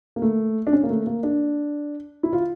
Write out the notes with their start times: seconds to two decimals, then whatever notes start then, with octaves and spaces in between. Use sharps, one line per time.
0.16 A#3
0.22 A3
0.67 D4
0.73 C#4
0.83 A#3
0.90 A3
1.07 A#3
1.23 D4
2.23 E4
2.33 F4